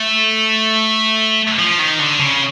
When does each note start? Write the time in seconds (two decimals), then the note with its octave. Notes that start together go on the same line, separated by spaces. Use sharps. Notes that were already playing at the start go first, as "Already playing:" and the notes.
Already playing: A3
1.59 F3
1.79 D#3
1.99 D3
2.19 C#3